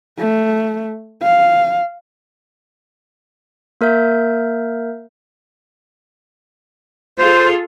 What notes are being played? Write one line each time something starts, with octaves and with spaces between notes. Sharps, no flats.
A3
F5
A#3 A#4 E5 G6
F4 G#4 A4 C5